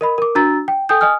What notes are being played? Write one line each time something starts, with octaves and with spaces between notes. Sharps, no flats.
A#4 D#5 B5
A#4 D6
D4 F#4 A#5 E6 A6
G5
A4 G5 G#5 D#6 G6
D#5 G#5 D#6 F6